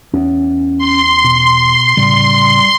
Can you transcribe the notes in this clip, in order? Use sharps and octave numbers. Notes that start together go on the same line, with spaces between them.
E2 C#4
C6
B2
A2 C#3 G3